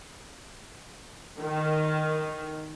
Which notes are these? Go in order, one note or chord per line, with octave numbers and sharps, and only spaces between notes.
D#3